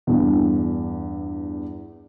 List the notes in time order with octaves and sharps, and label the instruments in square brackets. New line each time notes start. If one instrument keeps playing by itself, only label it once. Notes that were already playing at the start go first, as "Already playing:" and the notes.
[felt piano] E2 G2